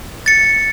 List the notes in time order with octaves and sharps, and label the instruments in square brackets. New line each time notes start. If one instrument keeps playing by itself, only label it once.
[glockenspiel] A6 C#7